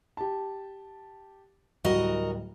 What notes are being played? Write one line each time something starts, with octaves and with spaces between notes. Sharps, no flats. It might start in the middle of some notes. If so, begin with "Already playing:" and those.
G4 A5
D1 G3 F#4 A#4 D#5